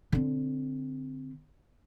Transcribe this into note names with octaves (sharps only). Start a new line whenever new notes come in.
D3 C4